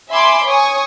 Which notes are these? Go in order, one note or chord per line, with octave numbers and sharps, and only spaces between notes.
E5 G#5 B5 C6 D6
C#5 G#5 C#6 D#6